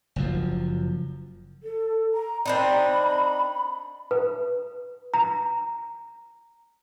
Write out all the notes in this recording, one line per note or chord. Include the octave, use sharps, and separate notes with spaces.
F#1 F#2 F3
A4
A#5
C4 D4 D#4 B5
B4
A#5